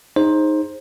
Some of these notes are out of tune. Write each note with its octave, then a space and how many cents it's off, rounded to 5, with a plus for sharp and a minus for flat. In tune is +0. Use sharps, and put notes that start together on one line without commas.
D#4 +0 G#4 +0 C5 +20